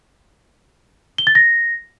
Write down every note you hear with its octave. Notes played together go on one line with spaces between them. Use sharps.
G7
A6
A#6